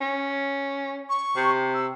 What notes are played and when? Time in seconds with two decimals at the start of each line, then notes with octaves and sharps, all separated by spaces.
0.01 C#4
1.09 C#6
1.36 C3
1.74 E6